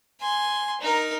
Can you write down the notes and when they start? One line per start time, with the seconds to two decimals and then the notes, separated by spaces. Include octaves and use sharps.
0.21 G#5 C6
0.81 D#4 A#4